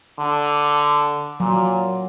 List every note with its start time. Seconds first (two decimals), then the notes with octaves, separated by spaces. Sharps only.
0.19 D3
1.40 A#2 F#3